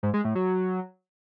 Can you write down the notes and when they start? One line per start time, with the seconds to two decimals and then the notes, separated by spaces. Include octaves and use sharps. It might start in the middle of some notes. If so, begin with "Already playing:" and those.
0.03 G#2
0.14 G#3
0.25 A2
0.35 F#3